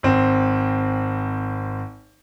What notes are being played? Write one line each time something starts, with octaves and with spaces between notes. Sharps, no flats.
G#1 C4